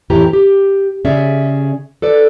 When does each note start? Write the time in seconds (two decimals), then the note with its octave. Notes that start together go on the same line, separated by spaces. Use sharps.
0.10 F2 A2 E3 G4 A#5
0.33 G4
1.05 C#3 C#4 G#4 D5 E5
2.02 A4 B4 D5